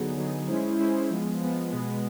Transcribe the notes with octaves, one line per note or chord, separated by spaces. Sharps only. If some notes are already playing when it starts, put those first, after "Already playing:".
Already playing: D3 F#3 B3 D#4 G#4
D3 F#3 B3 D#4 G#4
G#3 C#4 E4 G#4 C5
G#3 C#4 E4 G#4 C5
F3 G#3 B3
F3 G#3 B3
B2 G#3 B3